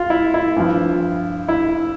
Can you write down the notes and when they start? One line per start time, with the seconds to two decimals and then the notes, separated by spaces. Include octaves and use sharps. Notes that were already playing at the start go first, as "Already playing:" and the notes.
Already playing: F4
0.10 E4
0.34 E4
0.56 G2 F3
1.48 E4